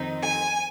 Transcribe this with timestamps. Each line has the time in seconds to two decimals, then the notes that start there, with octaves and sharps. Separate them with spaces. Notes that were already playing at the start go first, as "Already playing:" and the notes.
Already playing: F2 D#3 C4 D#4
0.22 G#5